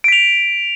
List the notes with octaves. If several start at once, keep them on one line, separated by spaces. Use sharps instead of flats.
B6 D7 F7